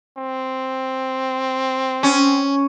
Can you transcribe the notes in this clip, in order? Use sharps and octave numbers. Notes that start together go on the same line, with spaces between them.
C4
C#4